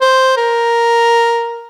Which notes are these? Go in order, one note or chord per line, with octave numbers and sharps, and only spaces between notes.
C5
A#4